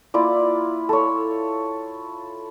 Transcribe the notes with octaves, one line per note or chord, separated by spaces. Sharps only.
A#3 E4 F4 D5
A4 C#5